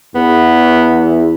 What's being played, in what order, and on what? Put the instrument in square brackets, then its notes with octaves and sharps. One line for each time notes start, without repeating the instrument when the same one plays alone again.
[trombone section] E2 [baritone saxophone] B3